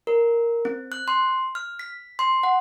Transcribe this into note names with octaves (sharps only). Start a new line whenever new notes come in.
A#4
C4
F#6
C6
F6
B6
C6
F#5